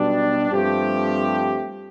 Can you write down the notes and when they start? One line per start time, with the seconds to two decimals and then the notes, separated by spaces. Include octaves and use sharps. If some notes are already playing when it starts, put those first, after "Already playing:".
Already playing: B1 B2 G3 D4
0.50 G2 F3 A3 C4 G4